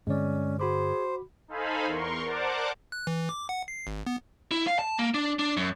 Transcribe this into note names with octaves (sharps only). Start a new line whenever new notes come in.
G2 D3 G#3 C4 C#4 D5
F#4 G#4 C5 B5 D6
D#4 A4 C5 F5 G#5 B5
E2 A#4 C6 C#6
A#4 C5 D5 F#5 A5 D6
F#6
E3
D6
F#5
C7
G#1
B3
E4
F5
A5
A#3
D4
D4
F#2